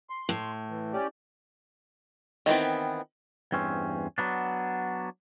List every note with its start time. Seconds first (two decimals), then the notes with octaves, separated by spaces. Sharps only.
0.10 C6
0.29 A2
0.70 E3
0.93 C#4 G4 D5
2.46 D#3 E3 B3 C4
3.52 E2 G2 C4 C#4
4.18 F#3 B3 D4